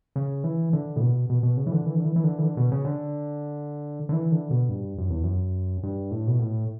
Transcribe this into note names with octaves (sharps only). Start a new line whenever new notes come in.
C#3
E3
D3
A2
B2
B2
B2
C#3
E3
D3
E3
D3
E3
E3
D3
E3
D3
B2
C#3
D3
D3
E3
D3
B2
G2
F#2
E2
F#2
G2
A2
B2
A2